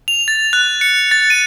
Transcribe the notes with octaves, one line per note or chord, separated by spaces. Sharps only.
F7
A6
F#6
C#7
A6
D#7